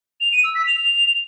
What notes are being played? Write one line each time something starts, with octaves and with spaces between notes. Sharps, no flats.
F7
D#7
E6
B6
F7